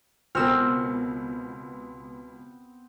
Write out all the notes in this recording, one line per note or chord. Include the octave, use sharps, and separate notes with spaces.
C#2 B2 B3 C4 A#4 E6 F6